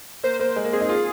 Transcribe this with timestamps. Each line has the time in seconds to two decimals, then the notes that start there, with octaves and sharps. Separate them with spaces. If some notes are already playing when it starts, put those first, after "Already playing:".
0.23 A#3 C5
0.40 A#3 C5
0.56 G#3
0.64 A#3
0.73 C4 G#4
0.81 D#4
0.89 F4